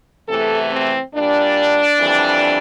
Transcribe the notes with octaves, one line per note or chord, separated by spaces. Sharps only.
E2 C3 E3 A3 A4
C4
A#2 G3 D4
F2 E3 G3